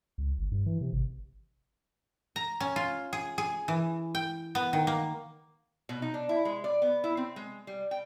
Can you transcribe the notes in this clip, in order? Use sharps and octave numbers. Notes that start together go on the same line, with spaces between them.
C#2
G1
G2
E3
C3
G#1
A#5
C#4
F4
G#4
G#4
E3
G5
B3
D#3
A#3
B2
D#4
D4
E4
G#3
D5
B3
E4
C4
G#3
G3
G5